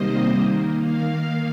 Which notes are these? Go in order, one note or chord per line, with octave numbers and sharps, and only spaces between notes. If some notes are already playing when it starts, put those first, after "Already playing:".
Already playing: C3 D#3 G3 A#3 C5 D#5
D#3 A#3
F5